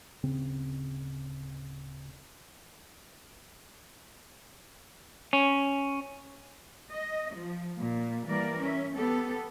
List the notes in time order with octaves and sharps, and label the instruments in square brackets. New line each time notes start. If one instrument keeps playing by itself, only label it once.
[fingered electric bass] D1 C#3 C4
[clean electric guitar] C#4
[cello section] D#5
F3
A#2
E3 G3 A#3 A#4 D5
C#4 E5
B3 G4 A4